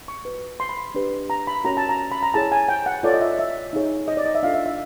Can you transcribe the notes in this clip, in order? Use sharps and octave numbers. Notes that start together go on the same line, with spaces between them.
C#6
F#4 B4
C6
B5
C6
D4 G4 B4
A#5
B5
C#4 F#4 A#4 C#5 A#5
A5
A#5
B5
A#5
E4 G#4 C#5 A5
G#5
G5
F#5
F4 A4 C#5 D5
D#5
E5
E5
D#4 G#4 C#5
D#5
D5
D#5
E5
D4 F4 A4 F5
E5
E5